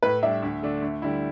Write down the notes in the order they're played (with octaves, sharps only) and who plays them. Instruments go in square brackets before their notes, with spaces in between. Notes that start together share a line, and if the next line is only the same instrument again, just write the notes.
[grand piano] A2 [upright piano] B4
[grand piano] G3 D4 [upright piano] E5
[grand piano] D2
D3 A3 D4
D2
D3 G3 E4